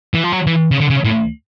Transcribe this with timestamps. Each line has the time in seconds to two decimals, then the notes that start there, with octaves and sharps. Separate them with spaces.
0.14 E3
0.24 F3
0.32 F#3
0.47 E3
0.71 C#3
0.81 D3
0.90 C#3
1.04 A2